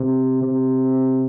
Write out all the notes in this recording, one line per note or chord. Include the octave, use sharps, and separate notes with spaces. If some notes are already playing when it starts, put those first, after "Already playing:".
Already playing: C3
C3